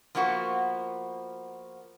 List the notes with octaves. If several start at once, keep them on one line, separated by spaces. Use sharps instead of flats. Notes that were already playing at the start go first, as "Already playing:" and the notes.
F3 A#3 B3 F#4